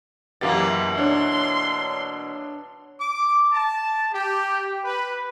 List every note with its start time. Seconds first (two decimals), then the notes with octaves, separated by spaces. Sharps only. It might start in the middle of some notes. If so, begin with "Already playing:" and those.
0.41 F#2 B2 E3 A#3 G4 A6
0.98 D4 C#5 C6
3.01 D6
3.53 A5
4.13 G4
4.84 B4